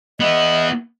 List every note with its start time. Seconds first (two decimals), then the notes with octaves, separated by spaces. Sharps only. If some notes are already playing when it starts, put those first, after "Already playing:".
0.20 B3 E4 D#5